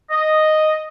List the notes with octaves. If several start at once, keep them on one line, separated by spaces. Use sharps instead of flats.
D#5